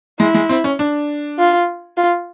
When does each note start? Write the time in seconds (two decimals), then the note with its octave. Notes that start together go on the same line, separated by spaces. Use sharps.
0.19 G#3 E4
0.34 G#3
0.49 C4
0.64 C#4
0.79 D4
1.38 F4
1.97 F4